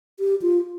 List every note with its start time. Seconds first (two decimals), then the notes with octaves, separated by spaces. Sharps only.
0.20 G4
0.42 F4